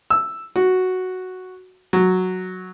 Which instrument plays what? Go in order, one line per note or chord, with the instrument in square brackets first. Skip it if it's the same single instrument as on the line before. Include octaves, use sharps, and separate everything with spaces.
[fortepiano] E6
F#4
F#3